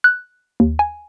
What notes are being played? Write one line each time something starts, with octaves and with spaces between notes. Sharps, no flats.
F#6
D#2
G#5